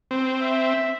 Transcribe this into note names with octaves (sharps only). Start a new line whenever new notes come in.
C4
E5